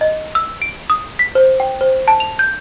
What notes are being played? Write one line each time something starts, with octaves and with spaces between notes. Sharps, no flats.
D#5
E6
D7
D#6
B6
C5
G5
C5
A5
F7
G6